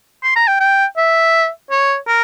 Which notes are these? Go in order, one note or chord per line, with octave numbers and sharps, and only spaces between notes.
C6
A#5
G5
G5
E5
C#5
A#4